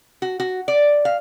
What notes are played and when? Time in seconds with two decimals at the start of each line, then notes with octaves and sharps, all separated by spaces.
0.22 F#4
0.40 F#4
0.68 D5
1.05 F5